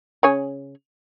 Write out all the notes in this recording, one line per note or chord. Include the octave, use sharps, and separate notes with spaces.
C#3 C#5 G#5